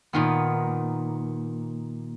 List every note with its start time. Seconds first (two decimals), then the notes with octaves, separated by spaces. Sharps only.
0.13 A#2 D#3 B3